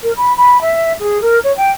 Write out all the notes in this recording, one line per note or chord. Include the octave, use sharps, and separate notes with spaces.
A#4
B5
B5
E5
G#4
A#4
C#5
G5